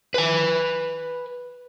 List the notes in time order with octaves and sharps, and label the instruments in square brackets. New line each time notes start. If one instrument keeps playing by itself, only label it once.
[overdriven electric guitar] B4 G#5